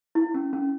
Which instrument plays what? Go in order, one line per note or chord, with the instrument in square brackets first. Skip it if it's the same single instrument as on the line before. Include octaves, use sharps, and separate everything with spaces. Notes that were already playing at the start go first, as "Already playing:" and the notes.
[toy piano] E4
C#4
C#4